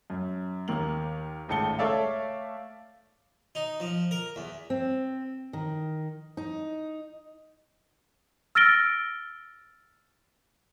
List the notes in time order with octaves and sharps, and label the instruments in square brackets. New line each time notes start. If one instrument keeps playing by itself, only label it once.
[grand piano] F#2
D#2 A#3 F#7
G#1 C#2 A2 A5 C#7 G7
A3 A4 C#5 D5 E5 F5
[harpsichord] D#4
F3
A#4
E2
[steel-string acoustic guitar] C4
D#3
D#4
[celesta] E6 F6 A6 A#6 D7 G7